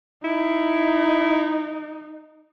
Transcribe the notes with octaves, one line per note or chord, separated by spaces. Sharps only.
D#4 E4